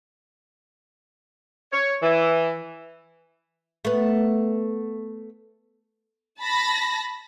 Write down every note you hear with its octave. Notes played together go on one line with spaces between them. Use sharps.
C#5
E3
A3 B3
A5 B5 A#6